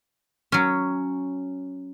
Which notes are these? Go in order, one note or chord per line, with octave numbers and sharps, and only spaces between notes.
F#3 C#4